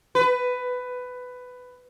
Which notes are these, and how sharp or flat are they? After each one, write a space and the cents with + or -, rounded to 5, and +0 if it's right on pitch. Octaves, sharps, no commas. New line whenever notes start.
B4 +15